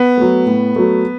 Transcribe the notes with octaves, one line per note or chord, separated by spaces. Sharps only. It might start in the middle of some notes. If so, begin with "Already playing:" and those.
Already playing: B3
F#3 A3
A2
F#3 A3